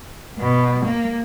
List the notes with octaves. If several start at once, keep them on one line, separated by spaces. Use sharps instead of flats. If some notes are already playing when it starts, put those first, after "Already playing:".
B2
A#3